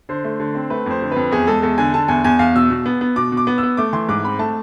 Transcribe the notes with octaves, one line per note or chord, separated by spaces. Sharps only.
D3 C5
A3
D3
C4
A3 B4
F2 C5
D3
F2 B4
E2 G#4
G#3 A4
E2 A4
D3 G#5
D3 A5
E2 G#5
E2 G#5
E2 F5
B2 E6
B2
B3
B3
B2 D6
B2
D6
B3
E6
B3
A3 D6
E3 C6
G#2 D6
C4 B5
A3 A5